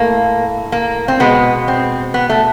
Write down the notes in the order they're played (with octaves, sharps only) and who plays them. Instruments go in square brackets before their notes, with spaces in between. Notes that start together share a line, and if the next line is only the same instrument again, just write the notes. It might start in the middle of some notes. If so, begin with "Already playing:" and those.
Already playing: [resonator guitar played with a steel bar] A2 A3 A#3
A#3
C4
B2 G#3 B3
C4
B3
A3